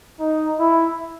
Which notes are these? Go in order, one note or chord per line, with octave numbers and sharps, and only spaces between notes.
D#4
E4